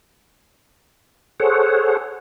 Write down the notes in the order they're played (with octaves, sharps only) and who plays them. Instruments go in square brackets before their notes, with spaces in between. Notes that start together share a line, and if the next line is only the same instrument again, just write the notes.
[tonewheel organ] G#4 A4 C5 C#5 F#5